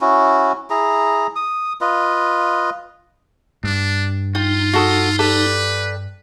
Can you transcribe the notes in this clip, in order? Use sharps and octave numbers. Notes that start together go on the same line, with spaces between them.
C#4 E4 F#4
E4 G#4 A#5
D#6
F4 B4 D#5
G2 D4
D#4 F4 G5
F#4 A4 D#6
G4 A4 B4 D5